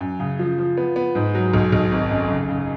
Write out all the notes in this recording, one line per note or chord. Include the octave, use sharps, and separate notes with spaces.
F#2
C#3
F3
F3
B3
B3
G#2
F#3
B1
B1
G#1
F#2
C#3
C#3